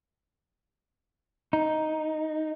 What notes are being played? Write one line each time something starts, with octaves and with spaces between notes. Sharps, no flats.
D#4